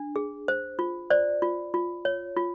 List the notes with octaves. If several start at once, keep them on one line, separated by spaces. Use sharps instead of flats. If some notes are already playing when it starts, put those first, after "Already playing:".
Already playing: D4
G#4
C5
F4
C5 D5
F4
F4
C#5
F4